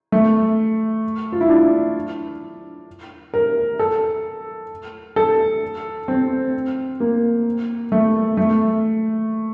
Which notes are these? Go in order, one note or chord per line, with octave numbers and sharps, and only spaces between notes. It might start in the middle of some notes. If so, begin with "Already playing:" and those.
A3
F4
E4
D4
A#4
A4
A4
C4
A#3
A3
A3